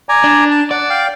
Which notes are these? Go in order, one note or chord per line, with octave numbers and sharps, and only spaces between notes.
D5 G#5 A#5
D4
A5
D5 F#5
F5 G5